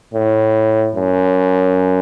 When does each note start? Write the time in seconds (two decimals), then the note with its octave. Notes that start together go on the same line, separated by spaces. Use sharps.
0.14 A2
0.95 F#2